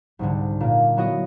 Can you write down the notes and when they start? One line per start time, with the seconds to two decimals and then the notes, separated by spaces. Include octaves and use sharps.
0.19 C2 G#2 D3
0.61 A#2 A#3
0.97 F#3 B3 E4 F#4 D#5